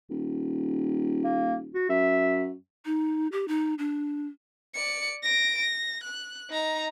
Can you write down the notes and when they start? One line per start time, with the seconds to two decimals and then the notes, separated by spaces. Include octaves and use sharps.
0.10 D#1
1.24 A#3
1.74 F#4
1.89 F#2 E5
2.86 D#4
3.32 G4
3.48 D#4
3.79 D4
4.74 D5 C#7
5.24 A#6 D7
5.58 A#6
6.04 F#6
6.50 D#4 A#5